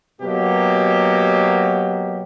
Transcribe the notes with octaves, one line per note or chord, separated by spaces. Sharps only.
B2 F#3 A#3 G4